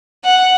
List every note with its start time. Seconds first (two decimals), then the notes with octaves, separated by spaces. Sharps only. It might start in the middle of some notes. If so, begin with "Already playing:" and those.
0.25 F#5